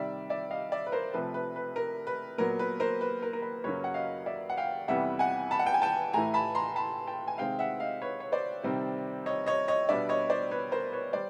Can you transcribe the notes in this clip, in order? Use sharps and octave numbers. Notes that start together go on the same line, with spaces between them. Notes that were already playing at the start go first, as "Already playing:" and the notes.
Already playing: C3 D#3 G3 D5 E5
D5 E5
D#5 F5
D5 E5
B4
A#4 C5
C3 F3 A3 B4
B4
B4
A#4
B4
A#2 F#3 B3 A#4
B4
A#4 C5
B4
A#4
A#4
B4
F#2 C#3 F#3 A#3 C#4 B4 C#5
F#5
D#5 F5
D5 E5
F#5
F5 G5
F2 C3 E3 G3 B3 E5 F#5
F#5 G#5
A5 B5
F#5
G5
G#5
G5 A5
A2 E3 A3 G#5 A#5
A5 B5
A#5 C6
A5 B5
G5 A5
G#5
C3 D#3 G#3 C4 F5 G5
E5 F#5
D#5 F5
B4 C#5
C#5
C5 D5
C3 D#3 G3 C4
C#5 D#5
C#5 D#5
C#5 D#5
B2 G3 B3 D4 D5 E5
C#5 D#5
C5 D5
B4 C#5
A#4 C5
B4 C#5
G3 C5 D5